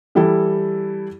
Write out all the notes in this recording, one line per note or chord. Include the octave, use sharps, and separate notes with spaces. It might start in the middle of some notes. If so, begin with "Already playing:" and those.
E3 G3 E4 A4